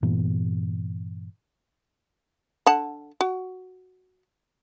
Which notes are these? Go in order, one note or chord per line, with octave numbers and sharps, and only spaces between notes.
G2 A#2 E3 B3
D3 F#5 A5
F#4